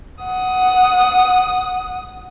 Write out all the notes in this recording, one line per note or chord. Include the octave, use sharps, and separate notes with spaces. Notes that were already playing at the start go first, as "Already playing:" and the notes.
F#5 D#6